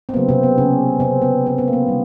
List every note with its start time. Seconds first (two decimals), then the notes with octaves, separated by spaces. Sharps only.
0.09 C4
0.14 C#3 F#3 A#3 B3
0.29 C3 C4
0.43 B3
0.58 C#3 C#4
1.00 C3 C4
1.22 B3
1.46 C4
1.58 B3
1.68 A#3
1.73 B3
1.87 C3 D#3 G3